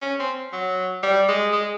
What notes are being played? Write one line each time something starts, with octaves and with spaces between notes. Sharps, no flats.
C#4
C4
F#3
G3
G#3
G#3